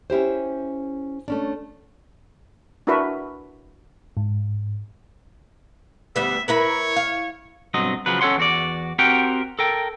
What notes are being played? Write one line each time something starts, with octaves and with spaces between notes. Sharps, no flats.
C#4 E4 G4 C5
A3 C#4 D4
D4 E4 F#4 A#4 B4 E5
G#2
D2 G3 B3 E5
E4 A#4 B4 C#5
F5
B1 G2 F#3 C4 D#5
C#3 F3 F#3 B4
C#4 A4 B4 C#5 F#5 C6
E2 F#4 D5
C4 F#4 G4 A#4 F#5 G5
A4 A#4 G5